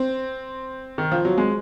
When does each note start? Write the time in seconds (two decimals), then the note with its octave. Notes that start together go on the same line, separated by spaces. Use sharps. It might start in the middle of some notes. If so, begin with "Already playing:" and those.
Already playing: C4
0.98 D#3
1.12 F3
1.25 F#3
1.38 G#3